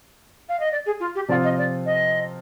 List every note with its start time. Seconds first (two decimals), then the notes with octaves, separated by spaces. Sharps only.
0.49 F5
0.59 D#5
0.71 D5
0.86 G#4
1.00 F4
1.15 G4
1.28 C3 F3 C4 F4 D5
1.43 D#5
1.57 D5
1.85 D#5